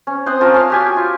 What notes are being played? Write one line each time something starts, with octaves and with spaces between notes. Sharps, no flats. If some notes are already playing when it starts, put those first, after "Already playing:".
C#4
C4 C5 F#5 D#6
C#4 F4 A#4 A5
C#4 F5
F#4 G4 G#5
F4